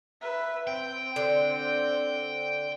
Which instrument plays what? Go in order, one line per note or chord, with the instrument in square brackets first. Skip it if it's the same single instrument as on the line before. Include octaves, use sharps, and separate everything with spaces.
[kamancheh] B4 E5
[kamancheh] C4 [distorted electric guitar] G5
[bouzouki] D3